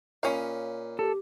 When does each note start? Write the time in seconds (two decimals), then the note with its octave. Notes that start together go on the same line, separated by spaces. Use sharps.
0.23 A#2 C#4 D#5 F5 B5
0.99 G4 A4